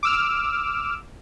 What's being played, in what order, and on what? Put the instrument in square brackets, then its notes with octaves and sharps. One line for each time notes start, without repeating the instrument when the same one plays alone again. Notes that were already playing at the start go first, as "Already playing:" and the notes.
[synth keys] D6 E6 F6